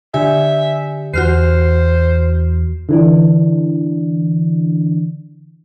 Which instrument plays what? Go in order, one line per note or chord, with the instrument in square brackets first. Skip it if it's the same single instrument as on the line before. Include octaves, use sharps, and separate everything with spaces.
[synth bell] D3 G4 G#5 [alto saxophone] E5
[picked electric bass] E2 [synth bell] F#4 F6 C7 [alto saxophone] C5
[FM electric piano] D3 E3 D4